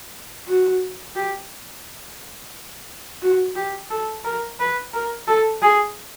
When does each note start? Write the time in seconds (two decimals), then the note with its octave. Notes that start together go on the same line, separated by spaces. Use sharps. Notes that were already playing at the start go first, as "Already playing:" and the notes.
0.47 F#4
1.15 G4
3.22 F#4
3.56 G4
3.90 A4
4.24 A#4
4.59 B4
4.93 A#4
5.28 A4
5.62 G#4